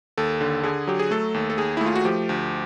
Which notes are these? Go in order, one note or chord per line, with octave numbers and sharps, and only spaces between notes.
D#2 A4
D3
D3 G#4
F#3 G4
G#4
A3 A4
D#2
A4
D#2 G#4
A3 E4
F4
F#4
F3 G4
D2